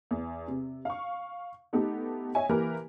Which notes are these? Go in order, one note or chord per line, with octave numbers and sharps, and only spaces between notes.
E2
C3
F5 C#6
A3 B3 D#4 G4 A4
C#5 D#5 E5 G#5
E3 A#3 G4 A#4 B4